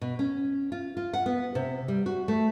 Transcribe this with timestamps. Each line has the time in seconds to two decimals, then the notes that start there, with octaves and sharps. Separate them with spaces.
0.01 B2
0.19 C#4
0.72 F4
0.97 F4
1.13 F#5
1.26 B3
1.55 C3
1.88 G3
2.06 F#4
2.28 A3